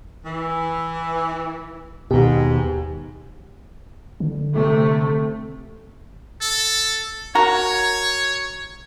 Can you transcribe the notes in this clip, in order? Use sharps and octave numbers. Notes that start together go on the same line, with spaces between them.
E3
D#2 G#2 B2 G4
D3
C3 A3
A4
F#4 A#4 C#5